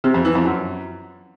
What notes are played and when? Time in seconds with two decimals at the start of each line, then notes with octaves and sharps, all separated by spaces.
0.04 C3
0.14 F2
0.25 E3
0.35 F2
0.46 F#2